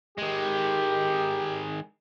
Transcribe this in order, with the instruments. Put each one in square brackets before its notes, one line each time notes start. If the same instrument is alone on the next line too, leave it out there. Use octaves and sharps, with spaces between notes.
[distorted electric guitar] D#3 G#3 [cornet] G4